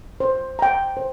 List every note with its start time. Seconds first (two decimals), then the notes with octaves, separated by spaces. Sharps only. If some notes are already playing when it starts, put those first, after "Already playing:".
0.20 C5
0.59 G5 A#5
0.97 C5